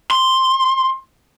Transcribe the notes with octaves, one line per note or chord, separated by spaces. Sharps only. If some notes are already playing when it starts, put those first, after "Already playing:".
C6